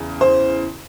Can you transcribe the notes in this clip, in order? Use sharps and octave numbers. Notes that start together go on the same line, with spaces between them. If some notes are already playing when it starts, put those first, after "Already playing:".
Already playing: E2 C#3 E3
C5